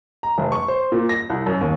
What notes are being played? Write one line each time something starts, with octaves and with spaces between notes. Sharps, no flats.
A#5
F1
C#6
C5
A#2
A#6
C2
F#2
D#2